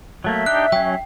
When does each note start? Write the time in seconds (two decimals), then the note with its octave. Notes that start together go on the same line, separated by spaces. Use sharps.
0.24 F#3 A3 A#3 E5
0.46 D4 D#4 G4 F#6
0.72 F#3 C#4 G5